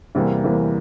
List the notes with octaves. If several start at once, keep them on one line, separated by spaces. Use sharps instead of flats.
E2 C3 E3 G3 A#3
E2 C3 E3 G3 A#3